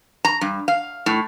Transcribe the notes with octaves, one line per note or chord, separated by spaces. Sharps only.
A#5
G2
F5
A2